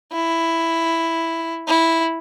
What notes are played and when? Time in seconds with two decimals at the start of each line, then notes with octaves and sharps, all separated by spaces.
0.13 E4
1.68 E4